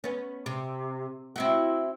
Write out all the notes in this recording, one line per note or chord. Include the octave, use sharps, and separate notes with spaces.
B3 C#4
C3
C4 E4 F#4